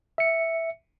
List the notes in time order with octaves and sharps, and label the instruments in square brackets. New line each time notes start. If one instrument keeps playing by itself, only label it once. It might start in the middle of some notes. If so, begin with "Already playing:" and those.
[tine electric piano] E5 C#7